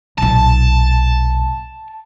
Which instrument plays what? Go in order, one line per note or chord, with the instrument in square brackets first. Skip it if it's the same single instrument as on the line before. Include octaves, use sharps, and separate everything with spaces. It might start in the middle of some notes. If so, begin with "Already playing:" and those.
[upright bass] B1 A#2 [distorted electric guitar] A5